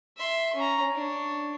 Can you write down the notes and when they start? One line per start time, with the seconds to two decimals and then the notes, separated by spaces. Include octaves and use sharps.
0.17 E5 C6
0.55 C#4 A#5
0.94 D4 C#5